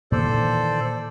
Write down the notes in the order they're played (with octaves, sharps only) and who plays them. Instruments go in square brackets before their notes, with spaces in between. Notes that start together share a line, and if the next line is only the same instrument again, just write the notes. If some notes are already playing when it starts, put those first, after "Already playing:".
[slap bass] A#2 D#3 E3 [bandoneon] A4 C5 D5